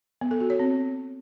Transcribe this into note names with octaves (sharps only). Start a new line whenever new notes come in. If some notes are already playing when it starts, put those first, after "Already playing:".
B3
A4
F#4
C#5
C4